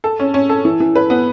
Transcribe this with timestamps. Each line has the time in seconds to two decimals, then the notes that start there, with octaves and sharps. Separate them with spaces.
0.04 A4
0.19 C#4
0.34 C#4
0.49 A4
0.65 E3
0.80 E3
0.95 B4
1.10 B3